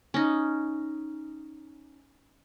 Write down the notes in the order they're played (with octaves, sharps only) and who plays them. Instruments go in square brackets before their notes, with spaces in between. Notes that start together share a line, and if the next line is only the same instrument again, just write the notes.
[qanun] C#4 D#4